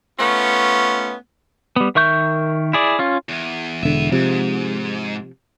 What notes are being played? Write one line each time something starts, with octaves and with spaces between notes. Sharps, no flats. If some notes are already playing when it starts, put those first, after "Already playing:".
A3 B3 C#4 F4
G3 B3
D#3 A#4 E5 C#6 G6
E4 G#4 D5
C#4 F4
E2
E1 D3 B3 E5
G#2 C3 F3